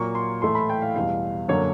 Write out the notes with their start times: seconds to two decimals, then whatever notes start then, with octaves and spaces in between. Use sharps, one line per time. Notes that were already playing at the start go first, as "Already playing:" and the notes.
Already playing: A#2 F#3 A#3 C#6
0.15 C6
0.42 A2 E3 A3 C6
0.55 B5
0.69 G5
0.82 F5
0.96 E2 B2 G3 F5
1.48 F#2 D3 F#3 A#3 C#5